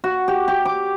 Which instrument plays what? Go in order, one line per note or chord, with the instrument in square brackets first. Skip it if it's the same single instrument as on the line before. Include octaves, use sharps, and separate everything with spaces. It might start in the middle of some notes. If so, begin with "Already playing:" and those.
[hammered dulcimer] F#4
G4
G4
D6